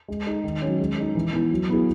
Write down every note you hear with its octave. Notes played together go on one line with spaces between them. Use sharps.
G#3
D#4 G#4
D#3
F#3 C#4
G#3
D#4 G#4
E3
B3 E4
F#3
B3 E4 G#4